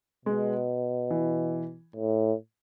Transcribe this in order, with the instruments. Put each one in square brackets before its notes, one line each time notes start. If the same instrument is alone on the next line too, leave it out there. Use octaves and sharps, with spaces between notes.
[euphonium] B2 [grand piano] G#3
[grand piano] E3
[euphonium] A2